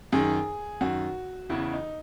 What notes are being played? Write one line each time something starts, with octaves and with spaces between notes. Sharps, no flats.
F#2 D#3 G#4
F#2 D#3 F#4
E2 C#3 E3 E4
D#4